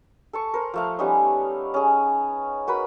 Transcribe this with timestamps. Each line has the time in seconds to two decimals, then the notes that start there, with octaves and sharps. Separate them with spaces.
0.33 A4 A5 C#6
0.54 A#4 C5
0.74 F3 A3 F5
0.99 G3 B3 C#4 D#4
1.74 C#4 G#4
2.67 F#4 A#4 B4 B5